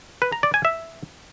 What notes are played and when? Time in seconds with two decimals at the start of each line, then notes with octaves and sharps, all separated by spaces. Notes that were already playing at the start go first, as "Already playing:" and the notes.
0.22 B4
0.32 A#5
0.43 D5
0.54 G#5
0.65 E5